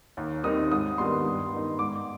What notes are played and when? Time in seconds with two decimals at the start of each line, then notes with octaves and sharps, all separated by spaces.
0.17 D#2
0.44 D#3 G3 C4 D#4 D#6
0.71 G#2 D#6
0.98 D#3 G3 B3 D4 C6
1.25 G2
1.53 D#3 B3 D#4
1.79 G#2 D6